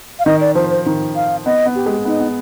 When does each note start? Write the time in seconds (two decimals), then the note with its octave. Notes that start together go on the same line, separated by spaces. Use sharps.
0.19 F5
0.26 D#3 D#5
0.41 D5
0.55 F3 C5
0.70 C5
0.86 D#3
1.15 F5
1.46 B3 D#5
1.66 B3
1.75 G4
1.86 G#3
2.05 B3 D#4
2.20 B3